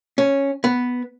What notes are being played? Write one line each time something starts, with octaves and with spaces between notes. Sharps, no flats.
C#4
B3